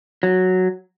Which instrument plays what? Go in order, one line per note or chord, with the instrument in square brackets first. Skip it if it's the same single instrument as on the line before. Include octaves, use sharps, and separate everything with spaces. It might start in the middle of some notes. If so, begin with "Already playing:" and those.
[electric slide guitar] F#3